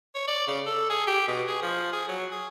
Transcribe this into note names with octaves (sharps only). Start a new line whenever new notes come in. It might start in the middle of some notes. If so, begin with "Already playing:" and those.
C#5
D5
C#3
A4
G#4
G4
B2
G#4
F3
G#4
F#3
G#4